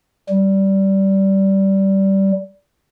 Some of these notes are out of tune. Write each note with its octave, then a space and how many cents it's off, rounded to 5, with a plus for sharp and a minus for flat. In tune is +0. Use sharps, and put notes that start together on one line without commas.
G3 -15